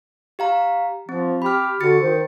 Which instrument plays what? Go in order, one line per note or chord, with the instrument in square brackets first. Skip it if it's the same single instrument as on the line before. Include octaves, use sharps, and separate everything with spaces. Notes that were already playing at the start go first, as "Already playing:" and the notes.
[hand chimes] G4 F5 A#5
[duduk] F3 [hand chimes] C4
[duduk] G4 [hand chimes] B5 F6
[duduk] D3 [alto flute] F#4 [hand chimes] A6 C#7
[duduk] D#3 [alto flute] C5